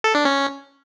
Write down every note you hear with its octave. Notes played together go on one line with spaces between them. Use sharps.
A4
D4
C#4